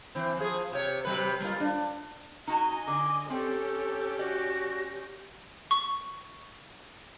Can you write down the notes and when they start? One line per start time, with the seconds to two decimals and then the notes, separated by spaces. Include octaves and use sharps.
0.15 E3 C4
0.37 F3 G#4
0.72 C3 C#5
1.05 C3 F#3 B4
1.40 G3 A#3 F4
1.60 D4
2.47 D#4 F#4 D#5 G#5 A#5
2.87 D3 D6
3.30 C4 C#4 G4 A4
4.19 F#4 D5
5.71 C#6